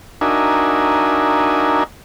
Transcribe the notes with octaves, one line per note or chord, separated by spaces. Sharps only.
D4 D#4 F#4 A#4 E5 G#5